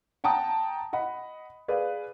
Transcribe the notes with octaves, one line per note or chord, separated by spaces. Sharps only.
F#5 G5 A5 A#5 D#6
D#5 F#5 B5
G#4 B4 D5 F5